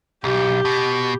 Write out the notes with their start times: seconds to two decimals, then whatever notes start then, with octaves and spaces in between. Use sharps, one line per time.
0.24 B1 G4
0.65 B2